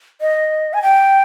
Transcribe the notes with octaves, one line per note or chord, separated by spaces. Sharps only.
D#5
G#5
G5